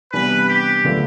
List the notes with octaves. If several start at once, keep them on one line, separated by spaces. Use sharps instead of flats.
C3 E3 G3 B3 D4 B4
G4
D3 A3 D4 F4 B4